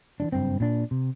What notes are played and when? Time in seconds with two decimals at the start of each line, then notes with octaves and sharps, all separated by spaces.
0.20 E3 G3 D4
0.32 F#1 G2 C4
0.60 A#2 D4
0.91 C3